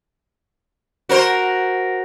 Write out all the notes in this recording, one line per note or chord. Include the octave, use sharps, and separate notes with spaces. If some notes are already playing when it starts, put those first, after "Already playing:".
F#4 A#4 C5